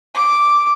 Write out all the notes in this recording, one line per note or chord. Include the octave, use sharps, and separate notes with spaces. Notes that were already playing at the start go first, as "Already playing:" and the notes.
D6